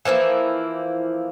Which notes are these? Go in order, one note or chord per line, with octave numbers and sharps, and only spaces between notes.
E3 F3 A#3 E4